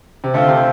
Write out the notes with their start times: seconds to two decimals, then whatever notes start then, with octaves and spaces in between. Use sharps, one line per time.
0.24 C3
0.34 D3 A3 C4 F4 C5
0.48 C3